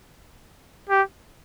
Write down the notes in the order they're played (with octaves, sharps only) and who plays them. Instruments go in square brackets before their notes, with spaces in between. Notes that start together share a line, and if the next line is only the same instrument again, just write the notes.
[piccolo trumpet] G4